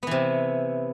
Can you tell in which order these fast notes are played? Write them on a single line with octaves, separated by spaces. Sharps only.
B3 E3 C3